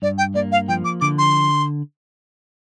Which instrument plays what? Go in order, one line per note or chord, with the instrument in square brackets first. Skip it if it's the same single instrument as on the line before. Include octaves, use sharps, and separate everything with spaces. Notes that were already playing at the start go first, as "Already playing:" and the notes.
[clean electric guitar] G2 [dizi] D5
[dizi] G5
[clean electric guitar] A#3 [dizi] D5
[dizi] F5
[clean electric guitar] F3 [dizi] G5
[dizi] D6
[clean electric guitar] D3 [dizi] D6
[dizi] C6